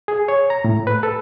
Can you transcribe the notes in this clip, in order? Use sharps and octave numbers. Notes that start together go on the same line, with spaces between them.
G#4
C#5
A#5
A2
B4
A4